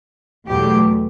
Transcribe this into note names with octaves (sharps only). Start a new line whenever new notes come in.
E2 B2 F#3 A3 G4